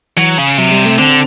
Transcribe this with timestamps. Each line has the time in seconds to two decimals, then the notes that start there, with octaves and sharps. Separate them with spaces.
0.17 E3 F#3
0.38 C#3
0.58 C3 F#3
0.72 G3
0.85 A3
0.99 D3 C4